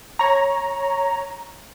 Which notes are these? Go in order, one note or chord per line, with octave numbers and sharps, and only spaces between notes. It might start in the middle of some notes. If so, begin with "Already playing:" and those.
C#5 A#5